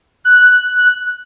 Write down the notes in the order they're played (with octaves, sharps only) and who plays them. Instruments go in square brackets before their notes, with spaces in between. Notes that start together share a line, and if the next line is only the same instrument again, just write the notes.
[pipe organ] F#6